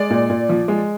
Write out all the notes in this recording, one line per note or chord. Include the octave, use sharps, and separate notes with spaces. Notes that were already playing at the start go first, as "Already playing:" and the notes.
Already playing: G#3 D5
A#2
A#2
F3
G#3